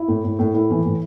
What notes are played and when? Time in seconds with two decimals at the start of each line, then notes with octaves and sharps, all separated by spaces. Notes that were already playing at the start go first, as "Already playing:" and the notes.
Already playing: E4
0.08 A2
0.24 A2
0.39 A2
0.54 A2 E4
0.70 E3
0.85 A2